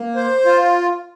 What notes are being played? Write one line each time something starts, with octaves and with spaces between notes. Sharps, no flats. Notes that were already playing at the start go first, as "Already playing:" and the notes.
Already playing: A#3
C5
F4